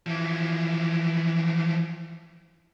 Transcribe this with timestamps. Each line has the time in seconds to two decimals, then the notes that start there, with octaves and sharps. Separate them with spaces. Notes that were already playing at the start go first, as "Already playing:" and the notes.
0.06 E3 F3